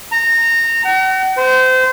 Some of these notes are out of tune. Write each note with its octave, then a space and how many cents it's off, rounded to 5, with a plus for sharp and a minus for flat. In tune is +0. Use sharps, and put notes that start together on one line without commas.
A#5 -20
F#5 +40
C5 -25